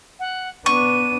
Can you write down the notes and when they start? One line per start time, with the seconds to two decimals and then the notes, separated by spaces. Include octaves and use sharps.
0.20 F#5
0.66 B3 D4 C#6 D#7